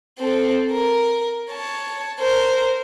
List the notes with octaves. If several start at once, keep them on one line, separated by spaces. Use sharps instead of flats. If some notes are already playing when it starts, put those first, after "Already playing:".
C4 A4
A#4
C#5 A5
A#4 C5